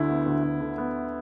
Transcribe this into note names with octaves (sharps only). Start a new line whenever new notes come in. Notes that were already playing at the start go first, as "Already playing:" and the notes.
Already playing: D2 D3 E4
B3
D2
D2
D3
B3